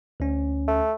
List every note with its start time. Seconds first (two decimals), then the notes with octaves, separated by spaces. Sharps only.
0.20 D2 C#4
0.68 A3